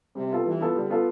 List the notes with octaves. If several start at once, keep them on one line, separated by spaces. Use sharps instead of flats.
C3 G3
B3 F4 A4
E3 G3
B3 F4 A4
D3 G3
B3 F4 A4